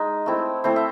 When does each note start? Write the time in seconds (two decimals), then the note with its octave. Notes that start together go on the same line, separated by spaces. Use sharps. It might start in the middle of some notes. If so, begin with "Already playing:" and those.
Already playing: G#3 D#4
0.26 A3 C4 E4
0.64 A3 C4 E4 C5
0.76 E5